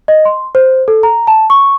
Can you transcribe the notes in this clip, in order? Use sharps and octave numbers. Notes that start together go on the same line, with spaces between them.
D#5
C6
C5
A4
A#5
A5
C#6